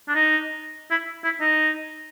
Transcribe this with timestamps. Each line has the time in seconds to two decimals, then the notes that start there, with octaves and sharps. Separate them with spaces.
0.08 D4
0.15 D#4
0.91 E4
1.24 E4
1.40 D#4